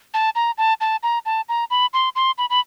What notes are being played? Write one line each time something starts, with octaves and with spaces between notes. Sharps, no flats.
A5
A#5
A5
A5
A#5
A5
A#5
B5
C6
C6
B5
B5